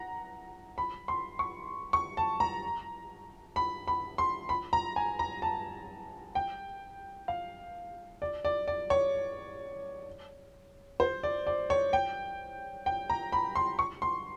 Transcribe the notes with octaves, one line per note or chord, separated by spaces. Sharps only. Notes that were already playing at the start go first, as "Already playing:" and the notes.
Already playing: F#5 A#5
B5
C6
C#6
C#6
A5
A#5
B5
B5
C6
B5
A#5
G#5
A#5
A5
G5
F5
D5
D5
D5
C#5
C5
D5
D5
C#5
G5
G5
A#5
B5
C6
C#6
C6